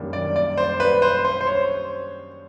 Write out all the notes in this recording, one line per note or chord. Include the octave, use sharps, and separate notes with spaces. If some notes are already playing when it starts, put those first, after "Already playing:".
Already playing: F#2 D#3 G3 A#3 D4
D5
D5
C5
B4
C5
C5
C5
C#5